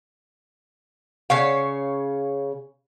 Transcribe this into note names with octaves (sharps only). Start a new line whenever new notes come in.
C#3 C#5 F5